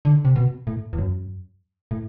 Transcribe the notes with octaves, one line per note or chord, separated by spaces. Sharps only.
D3
C3
B2
A2
E2
F#2
A2